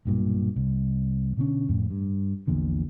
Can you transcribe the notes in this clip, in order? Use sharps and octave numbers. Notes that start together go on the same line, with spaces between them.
B1 G2 A#2
C2
B2 D3 C#4
F2 A2
G2
A#1 E2 A#2 D3